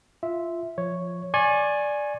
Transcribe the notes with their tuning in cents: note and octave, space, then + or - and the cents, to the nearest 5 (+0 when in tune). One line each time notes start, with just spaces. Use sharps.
F4 -10 E5 -5
F3 +0 C#5 +0
D5 +0 G#5 +0 C#6 -35